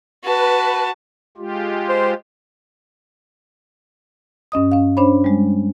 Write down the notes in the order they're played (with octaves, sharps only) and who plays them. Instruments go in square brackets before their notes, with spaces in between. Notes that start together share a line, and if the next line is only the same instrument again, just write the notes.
[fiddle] F#4 A5 [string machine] B4
[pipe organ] G#3 F4 G4
[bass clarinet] C5
[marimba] G2 C#4 D#5 D#6
C#4 F5
C#4 D4 C5 C#5 B5
G3 G#3